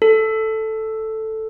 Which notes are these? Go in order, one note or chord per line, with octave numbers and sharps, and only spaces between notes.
A4